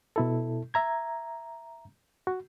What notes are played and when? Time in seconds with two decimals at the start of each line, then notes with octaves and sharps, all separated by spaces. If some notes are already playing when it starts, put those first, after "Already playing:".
0.16 B2 E4 A4
0.74 E5 A#5 G#6
2.27 F#4